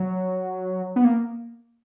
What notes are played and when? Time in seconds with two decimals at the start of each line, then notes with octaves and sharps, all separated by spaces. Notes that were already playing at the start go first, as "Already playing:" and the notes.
Already playing: F#3
0.96 B3
1.05 A#3